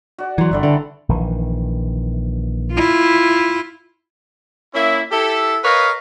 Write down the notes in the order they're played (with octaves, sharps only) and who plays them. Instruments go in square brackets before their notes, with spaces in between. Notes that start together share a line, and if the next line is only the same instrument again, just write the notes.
[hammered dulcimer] F#4 D5
[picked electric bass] E3 F#3 [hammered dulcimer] A#5 C6
[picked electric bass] G1 D3 [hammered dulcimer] G3 D5 E5
[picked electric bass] D3 [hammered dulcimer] E3 A5
[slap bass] A#1 D#3 E3
[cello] E4 F4
[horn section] A#3 C#4 E4
E4 G4 A4
A#4 B4 C#5 D#5 F5